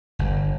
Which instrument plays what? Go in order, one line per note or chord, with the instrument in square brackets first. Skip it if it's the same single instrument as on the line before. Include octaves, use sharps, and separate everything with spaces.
[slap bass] G1